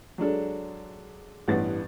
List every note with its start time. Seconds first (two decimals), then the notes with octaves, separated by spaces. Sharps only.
0.18 F#3 G#3 D4 A4
1.48 A1 G2 E3 B3 F#5 A6